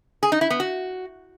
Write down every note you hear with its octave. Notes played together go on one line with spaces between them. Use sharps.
G#4
D#4
E4
B3
F#4